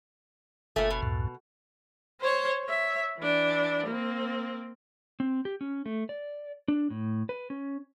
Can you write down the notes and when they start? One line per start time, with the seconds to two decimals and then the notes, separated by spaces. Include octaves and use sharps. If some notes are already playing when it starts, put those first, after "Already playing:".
0.76 F#1 A#2 A3 G#5
0.90 B2
1.03 C#2 F#2 A2
2.21 C5 C#5
2.64 C#5 E5
3.18 E3 D4
3.86 A#3 C4
5.20 C4
5.45 G4
5.61 C#4
5.86 A3
6.09 D5
6.68 D4
6.90 A2
7.29 B4
7.50 C#4